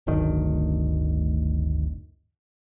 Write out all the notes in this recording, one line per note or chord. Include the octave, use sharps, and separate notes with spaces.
D1 G1 D2 D#3